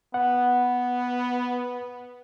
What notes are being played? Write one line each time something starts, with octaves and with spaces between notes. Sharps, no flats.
B3 F#5